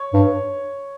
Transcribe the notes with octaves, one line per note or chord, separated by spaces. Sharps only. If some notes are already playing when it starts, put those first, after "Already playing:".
Already playing: C#5
G2